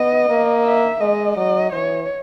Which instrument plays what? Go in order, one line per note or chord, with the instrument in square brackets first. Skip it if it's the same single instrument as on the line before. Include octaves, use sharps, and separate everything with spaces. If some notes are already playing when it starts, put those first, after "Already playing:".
Already playing: [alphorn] B3 [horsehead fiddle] D#5
[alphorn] A#3
[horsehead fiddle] E5
[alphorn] G#3 [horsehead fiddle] D#5
[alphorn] F#3 [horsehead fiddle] D#5
[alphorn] E3 [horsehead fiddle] C#5